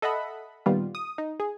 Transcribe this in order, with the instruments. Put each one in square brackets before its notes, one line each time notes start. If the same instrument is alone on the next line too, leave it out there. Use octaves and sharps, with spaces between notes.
[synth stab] A4 D#5 E5 F#5 B5
A#2 D#3 G3 B3 F4
D#6
D#4
G#4